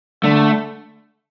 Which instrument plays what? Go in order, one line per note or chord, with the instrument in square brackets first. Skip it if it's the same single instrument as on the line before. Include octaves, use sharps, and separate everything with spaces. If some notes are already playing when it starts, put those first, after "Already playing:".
[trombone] D3 [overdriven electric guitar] A3